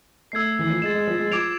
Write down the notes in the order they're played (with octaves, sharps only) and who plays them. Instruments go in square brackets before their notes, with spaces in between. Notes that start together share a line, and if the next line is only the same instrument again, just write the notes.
[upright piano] A3 [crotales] E6 G#6 C7
[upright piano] E3
F3
[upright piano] G#3 [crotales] A6 E7
[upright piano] G#3
F3
G#3
[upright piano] F3 [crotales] D6 G#6 D7 F7